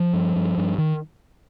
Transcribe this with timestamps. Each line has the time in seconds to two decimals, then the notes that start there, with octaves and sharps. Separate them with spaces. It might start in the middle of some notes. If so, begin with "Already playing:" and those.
Already playing: F3
0.13 G2
0.36 G2
0.58 G2
0.78 D#3